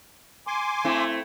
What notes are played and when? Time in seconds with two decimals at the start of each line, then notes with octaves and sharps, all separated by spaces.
0.47 G#5 C6 D6
0.84 A3 C4 E4